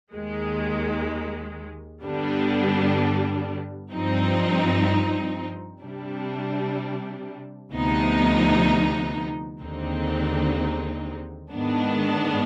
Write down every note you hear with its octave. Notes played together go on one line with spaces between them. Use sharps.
D#2 D#3 G#3
G2 D3 G3 B3 D4
G2 F3 C4 D#4
C3 G3 D4
D2 C3 F3 B3 D#4
D#2 D3 G#3 C4 D#4
G#2 D#3 B3 D4